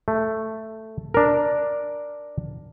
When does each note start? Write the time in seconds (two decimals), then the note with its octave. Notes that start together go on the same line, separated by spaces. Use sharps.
0.08 A3
1.14 D4 A#4